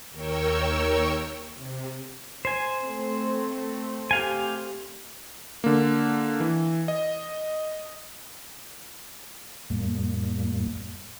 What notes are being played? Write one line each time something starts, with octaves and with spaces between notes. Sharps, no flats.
D#2 A#4 C#5 G5 C#6 E6
C3
C5 G#5
A3 C4
G4 F5 G#5
D3 A#3
E3
D#5
F2 A2 G3 A#3